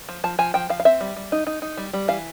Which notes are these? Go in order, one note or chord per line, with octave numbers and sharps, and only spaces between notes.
F3
F3 A5
F3 G#5
F3 G5
F3 F5
F5
C4 E5
G3
G3
D#4
D#4
D#4
G3
G3
E3 F5